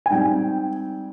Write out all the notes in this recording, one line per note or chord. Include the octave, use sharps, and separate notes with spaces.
G#5
G#2 G3 C4 G5